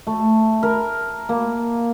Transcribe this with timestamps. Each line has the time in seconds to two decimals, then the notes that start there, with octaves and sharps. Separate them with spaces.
0.07 A3
0.63 A#4
1.29 A#3